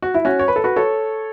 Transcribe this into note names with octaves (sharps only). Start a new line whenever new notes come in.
F#4
E4
C#4 F#4
C#5
B4
A4
F#4 B4
A4 C#5